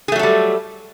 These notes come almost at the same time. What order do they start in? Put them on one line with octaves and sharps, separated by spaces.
G#4 A3 F#3 A4 G3